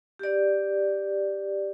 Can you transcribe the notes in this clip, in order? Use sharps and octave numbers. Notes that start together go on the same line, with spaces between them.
G4 D5